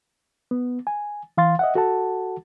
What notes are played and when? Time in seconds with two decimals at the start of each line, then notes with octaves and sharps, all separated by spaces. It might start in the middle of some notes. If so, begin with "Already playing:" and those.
0.51 B3
0.87 G#5
1.38 E3 F5 C6 A6
1.59 D#5 E5 F#5
1.75 F#4 A4 F#5 A5